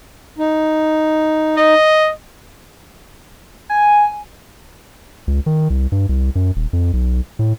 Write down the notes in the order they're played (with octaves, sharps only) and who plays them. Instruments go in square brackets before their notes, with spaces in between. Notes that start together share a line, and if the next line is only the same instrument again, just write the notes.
[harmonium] D#4
[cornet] D#5
[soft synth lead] G#5
[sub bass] C#2
D#3
C2
G2
C2
F#2
D#1
F2
B1
A2